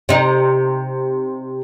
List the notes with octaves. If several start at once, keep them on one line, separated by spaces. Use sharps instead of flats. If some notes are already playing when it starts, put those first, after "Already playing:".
C3 D#4